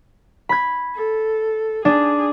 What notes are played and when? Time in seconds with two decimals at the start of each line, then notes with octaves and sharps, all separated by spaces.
0.49 B5 G#6
0.95 A4
1.85 D4 G#4